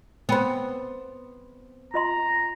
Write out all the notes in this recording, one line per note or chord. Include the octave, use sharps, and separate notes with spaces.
B3 C4 G5 B5
F4 D#5 A#5 C6